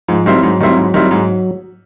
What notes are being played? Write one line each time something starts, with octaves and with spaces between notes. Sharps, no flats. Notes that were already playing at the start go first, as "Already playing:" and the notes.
G#2 F3
D#3 F#3 G3 C4 E4
G#2 F#3
D#3 G3 C4 E4
G#2
D#3 G3 C4 E4
G#2